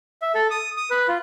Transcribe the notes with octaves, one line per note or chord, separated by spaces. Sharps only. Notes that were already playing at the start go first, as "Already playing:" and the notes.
E5
A4
D#6
D#6
B4
F4